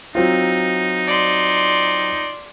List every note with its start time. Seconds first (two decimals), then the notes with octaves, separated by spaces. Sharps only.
0.15 F#3 C4 D#4 F4
1.07 D5 C6